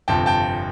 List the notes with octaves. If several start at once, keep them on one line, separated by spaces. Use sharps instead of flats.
G1 F2 C3 G5 A5
G5 A5